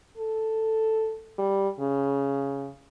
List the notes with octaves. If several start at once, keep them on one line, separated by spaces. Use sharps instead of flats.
A4
G3
C#3